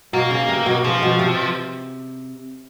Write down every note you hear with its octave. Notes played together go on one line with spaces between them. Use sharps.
B2 A#3
C#3
C3
B2
C#3 F3
B2
C3